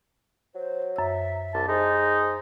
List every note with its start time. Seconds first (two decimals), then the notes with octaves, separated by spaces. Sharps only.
0.55 F#3 C5
0.96 F#2 E5 E6
1.54 C2 A5
1.68 G#3 D#4 C5